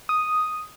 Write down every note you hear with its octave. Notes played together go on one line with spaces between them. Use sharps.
D#6